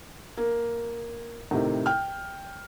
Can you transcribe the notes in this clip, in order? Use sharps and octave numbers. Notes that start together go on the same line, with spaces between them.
A#3
A2 C3 D#3
G5 F6